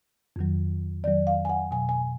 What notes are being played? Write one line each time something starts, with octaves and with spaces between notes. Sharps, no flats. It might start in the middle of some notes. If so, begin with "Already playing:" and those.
F2 D#3 F#3
F2 D#3 F#3 D5
F5
G#5
F#5
B2 F#3 G#5
G#5